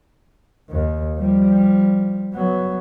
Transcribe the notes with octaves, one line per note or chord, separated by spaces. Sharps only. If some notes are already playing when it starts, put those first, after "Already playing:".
D#2
F3 G3
F#3 B3